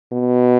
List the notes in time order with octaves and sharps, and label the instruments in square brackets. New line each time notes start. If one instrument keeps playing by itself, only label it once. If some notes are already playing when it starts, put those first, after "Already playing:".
[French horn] B2